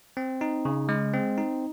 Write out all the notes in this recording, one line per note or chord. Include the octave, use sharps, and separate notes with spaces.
C4
D#4
C#3
G#3
C4
D#4